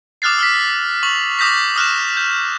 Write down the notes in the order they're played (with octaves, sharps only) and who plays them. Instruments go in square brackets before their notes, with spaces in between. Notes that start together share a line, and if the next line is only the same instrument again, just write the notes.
[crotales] D6 D#6 F6 F#6 A6 C7
E6 F6 B6
C#6 F7 F#7
D6 D#6 G6 A#6 B6
D#6 F6 F#6 E7
G6